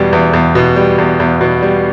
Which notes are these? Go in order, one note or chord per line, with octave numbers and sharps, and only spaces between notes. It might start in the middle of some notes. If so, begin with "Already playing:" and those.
Already playing: E2 B2 G3
E2
E2
B2
G3
E2
E2
B2
G3